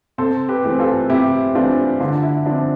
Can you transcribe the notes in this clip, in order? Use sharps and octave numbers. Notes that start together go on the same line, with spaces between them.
C3 A4 C5
G4 B4
E3 A3 C4
F4 A4
C3 E4 G4
E3 A3 C4 D4 F4
D3 D4 F4
E4
F3 C4 D4